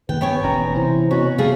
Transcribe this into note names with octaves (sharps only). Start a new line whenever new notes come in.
D#2 D#3 B4 G5
G2 B3 C#5 G5 G#5
E1 B2 C#4 A#5
C3 E3 C5
B2 C#4 F#4
C3 F3 G3 A3 G#4 F5